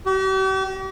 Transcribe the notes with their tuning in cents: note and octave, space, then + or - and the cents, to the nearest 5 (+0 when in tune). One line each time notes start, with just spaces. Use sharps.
G4 -45